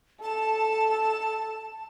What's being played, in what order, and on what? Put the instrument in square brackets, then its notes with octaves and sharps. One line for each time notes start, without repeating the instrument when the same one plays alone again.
[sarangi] A4 [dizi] A5